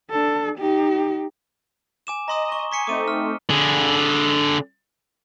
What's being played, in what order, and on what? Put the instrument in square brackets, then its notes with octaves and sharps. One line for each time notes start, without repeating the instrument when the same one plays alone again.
[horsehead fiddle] D4 A4
D#4 G4
[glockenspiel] G#5 D6 E7
[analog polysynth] D#5 [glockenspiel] A#5 C6 D#6
[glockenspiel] C#6 G7
[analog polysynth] G#5 [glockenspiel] C#6 B6 C#7
[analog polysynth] A3 C4 D#4 [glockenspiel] D6 D#7
[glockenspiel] F6
[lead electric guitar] D3 G#4